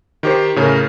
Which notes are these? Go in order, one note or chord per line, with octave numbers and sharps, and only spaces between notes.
D#3 G4 C5
A2 C#3 A#4